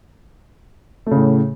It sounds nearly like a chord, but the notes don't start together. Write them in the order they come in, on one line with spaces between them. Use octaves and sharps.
A3 C#3 A2